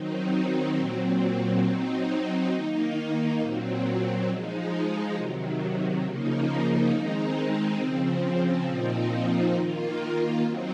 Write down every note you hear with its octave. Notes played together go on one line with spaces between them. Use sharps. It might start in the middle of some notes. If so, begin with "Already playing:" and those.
Already playing: D#3 F#3 C4 D#4
A#2 F#3 C4
F#3 C4 D#4
D#3 A#3 D#4
A#2 F#3 C4
F3 G#3 D#4
C3 D#3 F#3
C#3 F3 A#3 D#4
D#3 G#3 C4 D#4
C#3 F3 C4
A#2 F3 C4 D#4
D#3 A#3 F4
F#3 C4 D#4